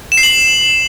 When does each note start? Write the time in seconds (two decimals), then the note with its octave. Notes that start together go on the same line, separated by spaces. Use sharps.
0.12 E7
0.18 C7
0.23 F#7